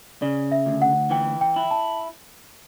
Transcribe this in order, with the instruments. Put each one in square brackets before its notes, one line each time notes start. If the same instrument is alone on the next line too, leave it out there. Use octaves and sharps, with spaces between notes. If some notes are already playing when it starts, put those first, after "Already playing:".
[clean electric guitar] C#3 [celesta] D5
[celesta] E5
[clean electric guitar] D2
[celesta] F#5
[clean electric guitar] E3 [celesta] G5
[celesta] G5
[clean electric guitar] E4
[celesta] A5